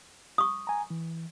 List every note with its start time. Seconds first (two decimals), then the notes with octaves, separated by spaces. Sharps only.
0.38 C#6 D#6
0.67 G#5 A#5
0.90 E3